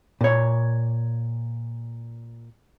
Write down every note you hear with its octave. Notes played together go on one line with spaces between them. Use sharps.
A#2 C#5